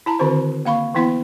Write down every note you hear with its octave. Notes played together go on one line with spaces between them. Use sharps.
E4 A5 A#5
D3 D#3 C4 F#4 C5
A#3 F5 B5 C#6
E3 B3 E4 C6